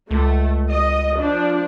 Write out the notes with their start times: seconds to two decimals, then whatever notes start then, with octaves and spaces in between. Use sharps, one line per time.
0.11 C#2 A3
0.68 D#5
1.17 F3 D4